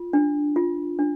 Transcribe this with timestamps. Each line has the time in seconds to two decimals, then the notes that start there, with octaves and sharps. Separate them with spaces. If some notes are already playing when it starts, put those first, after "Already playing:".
Already playing: F4
0.13 D4
0.56 F4
0.99 D4